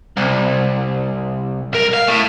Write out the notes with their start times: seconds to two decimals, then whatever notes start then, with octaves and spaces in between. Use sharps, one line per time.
0.17 C2
1.73 B1 A#4
1.93 F5
2.07 A2